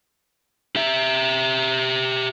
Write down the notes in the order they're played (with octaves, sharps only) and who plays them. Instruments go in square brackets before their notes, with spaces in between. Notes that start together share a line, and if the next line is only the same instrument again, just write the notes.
[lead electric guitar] G4 E5